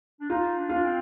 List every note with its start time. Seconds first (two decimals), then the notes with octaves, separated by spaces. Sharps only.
0.21 D4
0.29 D#4 F4
0.56 D4
0.69 D4 F4
0.84 C4